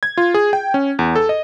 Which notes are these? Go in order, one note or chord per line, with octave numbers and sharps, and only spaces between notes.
G#6
F4
G#4
G5
C#4
E2
A4
D#5